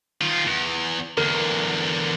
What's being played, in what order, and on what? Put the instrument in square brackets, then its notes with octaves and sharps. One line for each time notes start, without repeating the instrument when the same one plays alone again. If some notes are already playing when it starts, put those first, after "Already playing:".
[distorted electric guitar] D#3 F4
E2
[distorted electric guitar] E2 D3 [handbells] A#4